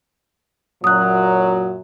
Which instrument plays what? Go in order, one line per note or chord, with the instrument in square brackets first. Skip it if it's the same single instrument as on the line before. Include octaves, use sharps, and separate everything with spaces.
[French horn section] F#2 A#2 F#3 [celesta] D#6 F#6